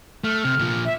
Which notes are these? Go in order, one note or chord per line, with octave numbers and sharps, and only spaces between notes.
A3 F6
C3
A#2 F3
E5